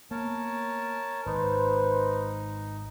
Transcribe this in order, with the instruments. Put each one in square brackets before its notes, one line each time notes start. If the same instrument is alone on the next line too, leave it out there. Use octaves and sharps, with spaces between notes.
[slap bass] A#3 B3 [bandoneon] A#4 C#5 A5
[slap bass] G#1 [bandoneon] D#4 [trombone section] B4 C5